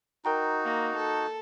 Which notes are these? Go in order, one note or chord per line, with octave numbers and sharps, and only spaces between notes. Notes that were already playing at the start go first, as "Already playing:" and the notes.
D#4 F#4 A#4 G5 A#5
A#3
A4